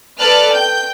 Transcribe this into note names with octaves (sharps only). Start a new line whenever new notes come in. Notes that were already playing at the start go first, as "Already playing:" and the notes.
A4 B4 D5 A5 F6 F#6
G5 G6